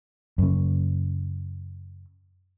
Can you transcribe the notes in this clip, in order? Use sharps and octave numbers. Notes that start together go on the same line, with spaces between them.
F#2 C#3